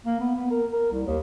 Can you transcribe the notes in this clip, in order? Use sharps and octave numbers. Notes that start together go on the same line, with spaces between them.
A#3
B3
B3
A#4
A#4
C2
D#2